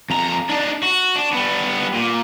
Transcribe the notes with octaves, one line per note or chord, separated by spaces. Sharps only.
F2 A#5
D4 D#4
F#4
D4
G3 B3
A#2